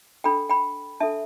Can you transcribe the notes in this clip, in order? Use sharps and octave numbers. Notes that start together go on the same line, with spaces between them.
D4 A4 G5 B5
G5 B5
D4 A4 E5 A5